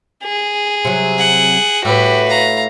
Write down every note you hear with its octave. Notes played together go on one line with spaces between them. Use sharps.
G#4
C3 F#3
F#5
A2 F#4 G4 B4
F5 A#5